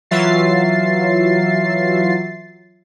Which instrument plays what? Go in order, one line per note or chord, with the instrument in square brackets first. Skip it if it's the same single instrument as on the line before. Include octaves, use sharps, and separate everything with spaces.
[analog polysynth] E3 F#3 F4 E5 A6 C7